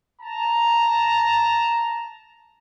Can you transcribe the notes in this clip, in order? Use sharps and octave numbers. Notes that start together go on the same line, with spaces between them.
A5 A#5